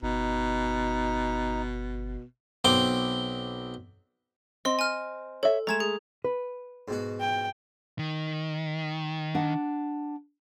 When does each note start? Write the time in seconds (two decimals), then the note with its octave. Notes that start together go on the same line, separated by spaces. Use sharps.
0.03 G1 B2 D#4
2.65 B1 C4 C6 D6
4.65 C4 D#5 C6
4.79 G#5 F6
5.43 A4 C#5 E5
5.67 G#3 A3 A#5 G#6 E7
5.80 G#4
6.24 B4
6.88 G#2 B2 F#4
7.20 G5
7.99 D#3
9.35 D4 F#5